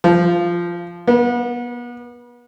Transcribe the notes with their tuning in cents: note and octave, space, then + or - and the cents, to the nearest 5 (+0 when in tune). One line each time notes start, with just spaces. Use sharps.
F3 -10
B3 -35